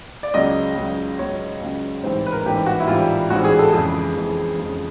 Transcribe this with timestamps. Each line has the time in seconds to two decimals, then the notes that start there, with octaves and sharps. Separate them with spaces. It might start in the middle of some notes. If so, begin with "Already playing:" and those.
0.23 D5
0.34 C#2 C#3 F#3 D#5
0.76 C#2 C#3 F#3
1.19 C#2 C#3 F#3 C#5
1.61 C#2 C#3 F#3
2.03 A1 G#2 E3 G3 C4 C5
2.26 B4
2.32 A#4
2.45 A1 G#2 E3 G3 C4 G4
2.66 F#4
2.80 E4
2.88 A1 G#2 E3 G3 C4 F4
3.30 A1 G#2 E3 G3 C4 F#4
3.44 G#4
3.59 A4
3.72 F2 C#3 E3 G#3 G#4
4.16 F2 C#3 E3 G#3
4.58 F2 C#3 E3 G#3